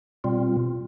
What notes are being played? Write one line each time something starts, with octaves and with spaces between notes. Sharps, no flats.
B2 G3 C4 F4